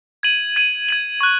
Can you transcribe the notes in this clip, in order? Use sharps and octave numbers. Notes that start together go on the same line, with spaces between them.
G#6 D#7 F#7
G#6 D#7 F#7
G#6 D#7 F#7
C#6 F#6